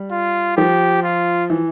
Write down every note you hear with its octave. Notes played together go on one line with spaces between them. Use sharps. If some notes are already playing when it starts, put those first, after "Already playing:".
Already playing: G3
F4
F3 G4
F4
E3